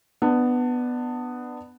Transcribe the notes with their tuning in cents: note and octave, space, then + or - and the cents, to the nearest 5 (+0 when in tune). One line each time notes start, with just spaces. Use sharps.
B3 +5 D4 +20